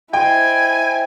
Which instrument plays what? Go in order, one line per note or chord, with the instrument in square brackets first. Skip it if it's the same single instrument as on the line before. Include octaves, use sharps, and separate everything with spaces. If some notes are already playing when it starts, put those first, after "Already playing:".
[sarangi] E4 [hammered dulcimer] C5 D#5 [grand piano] G5 [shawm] G#5